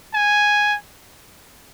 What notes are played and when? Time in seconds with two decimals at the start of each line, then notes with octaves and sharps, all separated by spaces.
0.14 G#5